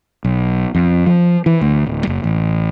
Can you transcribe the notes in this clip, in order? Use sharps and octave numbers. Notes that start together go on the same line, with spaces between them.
B1
F2
F3
E3
D2
D1
F#1
A1